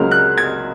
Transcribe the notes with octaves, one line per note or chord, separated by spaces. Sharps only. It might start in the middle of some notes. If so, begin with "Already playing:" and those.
Already playing: C#2 C#3 F#3 A#3 F6
F#6
G#6